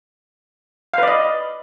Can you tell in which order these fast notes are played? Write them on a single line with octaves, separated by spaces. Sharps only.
F5 B4 D5 D#5